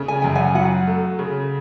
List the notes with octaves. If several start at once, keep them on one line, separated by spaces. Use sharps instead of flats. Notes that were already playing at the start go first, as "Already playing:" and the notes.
Already playing: C#3 A3
G#5
F#2 G5
F#5 G#5
F#3 F#5 G#5
A3
C#3